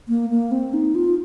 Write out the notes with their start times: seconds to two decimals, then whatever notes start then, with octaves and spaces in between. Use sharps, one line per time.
0.09 A#3
0.30 A#3
0.52 C4
0.74 D#4
0.95 F4